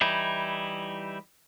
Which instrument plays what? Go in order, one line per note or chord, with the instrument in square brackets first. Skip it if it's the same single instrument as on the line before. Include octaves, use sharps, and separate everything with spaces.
[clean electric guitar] E3 G3 D#4 E4